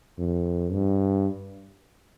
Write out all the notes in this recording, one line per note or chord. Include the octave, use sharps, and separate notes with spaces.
F2
G2